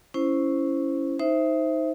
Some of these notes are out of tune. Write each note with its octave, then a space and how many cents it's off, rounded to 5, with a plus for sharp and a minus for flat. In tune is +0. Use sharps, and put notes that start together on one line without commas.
C#4 +0 E4 +0 C5 +0
D#4 +15 C5 +0 E5 +0